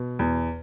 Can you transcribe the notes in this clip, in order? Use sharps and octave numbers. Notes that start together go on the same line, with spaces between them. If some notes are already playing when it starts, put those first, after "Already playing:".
Already playing: B2
E2